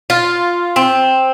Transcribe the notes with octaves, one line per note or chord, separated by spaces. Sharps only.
F4
C4